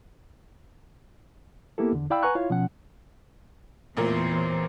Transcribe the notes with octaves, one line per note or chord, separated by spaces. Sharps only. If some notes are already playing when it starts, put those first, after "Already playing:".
A#3 B3 E4 G4 A4
E2 D3
E4 D5 F5 G5 B5 E6
B4 F#5 G#5 A#5 C#6 F#6
E4 F4 C#5 F5
B2 F3 C#4 F#5
A1 E2 A#2 E3 A#4 C5